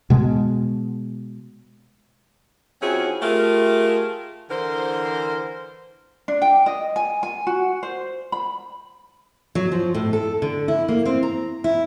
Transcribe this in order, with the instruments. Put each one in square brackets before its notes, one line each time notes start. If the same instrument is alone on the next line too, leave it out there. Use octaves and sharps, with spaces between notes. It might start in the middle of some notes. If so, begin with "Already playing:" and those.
[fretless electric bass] B2 G#3
[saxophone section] F3 C4 C#4 E4 F#4 G#4
A3 F4 G4 G#4 A#4
D3 E3 A#4 C5
[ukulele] D4
G5
D#5
G#5
G#5
F#4
C5
B5
[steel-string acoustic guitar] F#3
F3
A2
A4
D3
E4
A#3
C4
A#5
E4